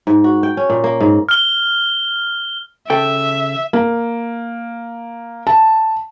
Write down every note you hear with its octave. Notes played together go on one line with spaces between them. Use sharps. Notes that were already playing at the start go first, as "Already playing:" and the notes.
G#2
F#4
G5
C#4
A#2
A#3
G#2
F6 G7
C#3 A4 E5 G5
A#3
A5